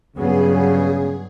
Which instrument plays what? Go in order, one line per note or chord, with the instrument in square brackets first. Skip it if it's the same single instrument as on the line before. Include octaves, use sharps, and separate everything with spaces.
[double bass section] G2 F#3 B3 [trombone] C#3 [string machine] G#4